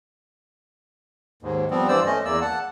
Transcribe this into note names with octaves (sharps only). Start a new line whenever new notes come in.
D#2 G#2
F3 G3 B3 C4
G2 E3 C5 D5 E6
A3 C#4 D#5
E2 A#3 D5 E6
F#5 A5